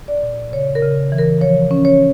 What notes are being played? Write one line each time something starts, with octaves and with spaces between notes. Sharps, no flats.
D5
A#2
C#3 C#5
A#4
C#3
E3
A#4
F3 C#5
C#4
C#5